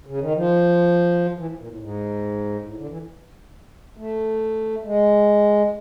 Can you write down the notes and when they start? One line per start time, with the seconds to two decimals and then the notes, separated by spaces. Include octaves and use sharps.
0.07 C#3
0.20 D#3
0.35 F3
1.37 E3
1.58 A#2
1.68 A2
1.79 G#2
2.66 A2
2.77 D3
2.88 E3
3.97 A3
4.84 G#3